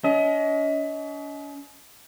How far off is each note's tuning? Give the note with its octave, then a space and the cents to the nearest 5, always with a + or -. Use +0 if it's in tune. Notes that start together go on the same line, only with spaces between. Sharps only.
C#4 +45 D#5 +30